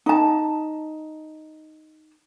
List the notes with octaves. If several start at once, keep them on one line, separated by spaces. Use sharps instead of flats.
D#4 A5